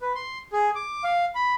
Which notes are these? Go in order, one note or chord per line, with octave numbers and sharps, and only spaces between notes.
B4
C6
G#4
D6
F5
B5